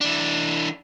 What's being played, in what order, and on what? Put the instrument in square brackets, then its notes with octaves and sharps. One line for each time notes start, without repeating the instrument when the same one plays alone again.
[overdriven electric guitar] E3 D4